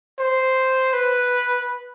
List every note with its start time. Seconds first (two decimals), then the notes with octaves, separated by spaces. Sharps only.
0.19 C5
0.93 B4